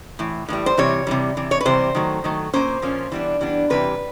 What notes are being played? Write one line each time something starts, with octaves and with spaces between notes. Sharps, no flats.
A2 E3
A2 E3 G3
C5
C3 E3 G3 C#5
C3 E3 G3
C3 E3
C#5
B4
C3 E3 G3 C5
D#3 F#3 A3
D#3 F#3 A3
A#2 F3 A#3 C#4 C5
A#2 F3 A#3 C#4
E3 G3 B3 D4
E3 G3 B3 D4
C3 E3 G3 B4